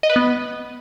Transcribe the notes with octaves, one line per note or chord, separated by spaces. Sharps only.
D#5
B4
B3